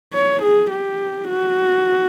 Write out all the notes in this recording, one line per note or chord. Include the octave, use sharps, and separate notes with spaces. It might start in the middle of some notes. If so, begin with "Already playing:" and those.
C#5
G#4
G4
F#4